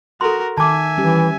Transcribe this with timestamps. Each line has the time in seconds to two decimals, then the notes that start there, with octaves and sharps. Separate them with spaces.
0.21 F#4 A4 A#4 C6
0.58 D#3 E5 G#5 A5 D6
0.98 E3 G3 C#4 G4